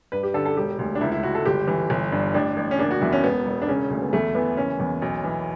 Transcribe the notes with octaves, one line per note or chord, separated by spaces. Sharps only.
G2 B4
G4
D3 A4
A4
E1 G4
D2
D4
C#2 E4
E4
C#2 F#4
A4
G1 G4
E3
G1
G2
A1 D4
A1
C#4
F#1 D4
F#4
E2 E4
C#4
E1 B3
E1
D4
C#3 C#4
D2
B3
E2 A3
E3 B3
F#1 C#4
E2
B1
E3